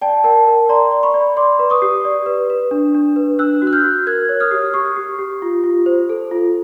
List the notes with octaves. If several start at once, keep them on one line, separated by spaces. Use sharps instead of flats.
D5 G5 A5
A#4 G5 A5
A#4
D5 A#5 C6
D5
B5 C#6
D5
D5 C6 D6
B4
C#6 D#6
G4
D5
B4
B4
D4
D4
B4
D4 E6 F#6
F#4
F#6
F6 G6
F#4
A#4 F#6 G#6
C#5
D#6 F6
G4
G4 C#6 D#6
G4
G4
F4
F4
C5
A4
F4